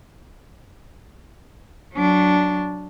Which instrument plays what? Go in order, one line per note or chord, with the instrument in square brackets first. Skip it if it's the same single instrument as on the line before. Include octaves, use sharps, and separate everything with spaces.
[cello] F#3 D4